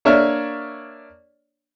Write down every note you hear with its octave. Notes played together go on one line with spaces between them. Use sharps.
A#3 D4 C#5 D5 E5 F6